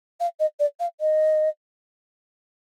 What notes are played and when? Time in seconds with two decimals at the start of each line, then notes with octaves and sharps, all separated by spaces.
0.20 F5
0.39 D#5
0.59 D5
0.79 F5
1.00 D#5